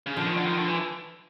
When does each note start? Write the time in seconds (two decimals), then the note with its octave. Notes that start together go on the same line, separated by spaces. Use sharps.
0.06 C#3
0.16 D3 F3
0.26 D#3
0.37 D3
0.47 D#3
0.57 D3
0.68 E3